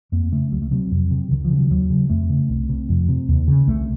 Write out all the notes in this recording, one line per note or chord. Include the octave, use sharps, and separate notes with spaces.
F2 A#3
C#3 A3
C#2 F#3
A3
C3 F#3
F2
C3
C#2 D#3
F3
C#3
F#3
D#2 F#3
C#3
F2 A3
C#3
C2
C3
F2
C3
D#2
C#3
C2 A3